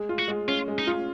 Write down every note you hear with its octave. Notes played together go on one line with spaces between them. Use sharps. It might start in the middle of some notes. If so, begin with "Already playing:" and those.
Already playing: G#3 G#4
F4
F#4
G#3
C#4 F4
G#3
D#4
F4